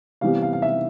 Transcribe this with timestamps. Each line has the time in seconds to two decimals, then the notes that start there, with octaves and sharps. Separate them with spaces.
0.21 C3 E3 G3 B3 F5
0.42 F5
0.53 F5
0.62 E5